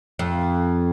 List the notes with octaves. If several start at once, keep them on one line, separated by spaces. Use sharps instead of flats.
F2